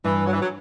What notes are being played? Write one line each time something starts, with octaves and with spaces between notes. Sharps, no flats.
G2 E3
F#3
E3
F#3